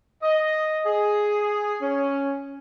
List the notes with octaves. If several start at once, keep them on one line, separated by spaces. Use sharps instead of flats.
D#5
G#4
C#4